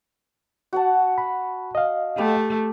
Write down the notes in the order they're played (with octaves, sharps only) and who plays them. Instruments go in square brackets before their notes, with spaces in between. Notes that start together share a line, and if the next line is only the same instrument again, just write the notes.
[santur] F#4 F#5 A5
[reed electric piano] B5
D#5 F5
[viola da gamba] A3 [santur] G4 B5